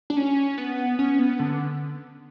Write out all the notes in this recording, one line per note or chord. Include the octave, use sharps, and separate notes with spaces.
D4
C#4
B3
C#4
B3
D3